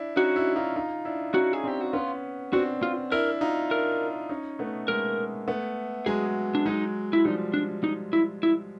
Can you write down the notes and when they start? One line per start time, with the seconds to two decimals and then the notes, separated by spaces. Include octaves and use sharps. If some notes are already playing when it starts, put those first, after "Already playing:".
Already playing: D4 E4
0.16 C#4 D#4 F#4
0.36 D4 E4
0.56 D#4 F4
0.76 D#4 F4
1.05 D4 E4
1.34 C#4 D#4 F#4
1.53 G#4
1.64 C4 D4 G4
1.81 F#4
1.93 B3 C#4 F4
2.53 C4 D4 F#4
2.83 F4
3.11 D4 E4 A#4
3.41 D#4 F4
3.70 D4 E4 A#4
4.29 C#4 D#4
4.59 A3 B3
4.88 G#3 A#3 A#4
5.48 A3 B3
6.06 F#3 G#3 G#4
6.55 D4
6.66 F#3 G#3 D#4
7.13 E4
7.25 F3 G3 D#4
7.54 D4
7.84 D#4
8.13 E4
8.43 E4